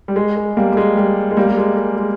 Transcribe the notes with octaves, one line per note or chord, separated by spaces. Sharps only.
G3
G#3
G#3
G3 A#3
G3
G#3
G3
G#3
G3 A#3
G3
G#3
G#3
G#3